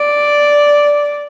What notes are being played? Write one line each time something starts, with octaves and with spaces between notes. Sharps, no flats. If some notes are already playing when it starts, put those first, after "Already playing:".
Already playing: D5